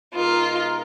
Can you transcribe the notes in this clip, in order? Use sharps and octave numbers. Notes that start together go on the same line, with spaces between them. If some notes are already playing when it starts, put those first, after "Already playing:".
B2 G#3 D#4 F4 A#4